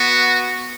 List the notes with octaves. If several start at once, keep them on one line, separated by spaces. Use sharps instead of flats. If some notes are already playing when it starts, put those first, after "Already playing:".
Already playing: B3 F#4